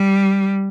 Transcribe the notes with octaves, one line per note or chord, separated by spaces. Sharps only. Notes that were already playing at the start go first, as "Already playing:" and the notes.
Already playing: G3